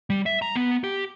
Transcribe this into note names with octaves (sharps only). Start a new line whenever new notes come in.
G3
E5
A#5
B3
G4